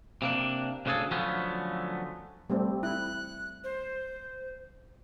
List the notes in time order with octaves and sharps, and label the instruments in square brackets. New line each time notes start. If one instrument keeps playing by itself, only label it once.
[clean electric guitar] C3 A#3 D4
D2 C#3 D4 D#4 G#4 A4
D3 F3 F#3 A3 B3 C#4
[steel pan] G3 A3 C4
[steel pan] E4 [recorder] F#6
[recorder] C5